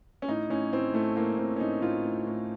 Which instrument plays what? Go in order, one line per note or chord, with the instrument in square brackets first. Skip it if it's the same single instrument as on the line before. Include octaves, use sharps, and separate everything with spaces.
[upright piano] C#4
A2 D#4
A2 C#4
A2 C4
A2 A3
A2 A#3
A2 C4
C#4
A2 D#4
A2 F4
A2
A2